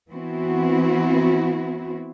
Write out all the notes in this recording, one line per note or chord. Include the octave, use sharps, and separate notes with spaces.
E3 B3 C4 E4 F#4